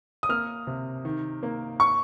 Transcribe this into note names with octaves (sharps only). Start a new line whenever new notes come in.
D#6
A#3 F6
C3
D#3
A#3
C#6